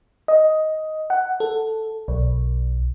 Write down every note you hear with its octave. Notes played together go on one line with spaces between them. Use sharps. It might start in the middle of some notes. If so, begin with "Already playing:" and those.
D#5
F#5
A4
B1